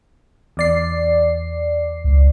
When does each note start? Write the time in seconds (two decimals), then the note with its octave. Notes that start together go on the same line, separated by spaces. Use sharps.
0.57 E2 D5 C7
2.04 C#2